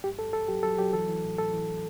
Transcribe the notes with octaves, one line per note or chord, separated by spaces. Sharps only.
G2 G4
G2 A4
G2 A4
F#3 G4
F#3 A4
F#3 G4
E3 A4
E3
A2
A2 A4
E3
E3